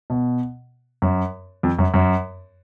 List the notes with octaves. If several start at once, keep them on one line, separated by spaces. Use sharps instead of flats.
B2
F#2
F2
F#2
F#2